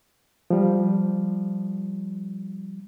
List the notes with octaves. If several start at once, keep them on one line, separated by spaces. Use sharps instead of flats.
F3 G3